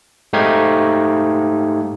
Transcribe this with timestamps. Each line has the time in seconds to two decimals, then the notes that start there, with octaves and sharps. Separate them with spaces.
0.33 G#2 A3 D#4 G4 F5 G#6